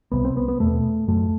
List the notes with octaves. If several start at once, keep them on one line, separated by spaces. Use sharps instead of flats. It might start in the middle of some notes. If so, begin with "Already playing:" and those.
C2 C3 B3
C4
B3
B3
E2 B2 A3
F#2 A3